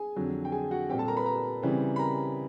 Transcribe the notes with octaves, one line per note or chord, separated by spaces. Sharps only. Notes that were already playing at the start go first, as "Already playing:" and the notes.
Already playing: G#4 G#5
F2 D3 F#3
G5
G#4 G#5
F#4 F#5
A#2 G3 C4 G4 G5
A4 A5
A#4 A#5
B4 B5
A#4 A#5
C#3 E3 G3 C4
B5
A#4 A#5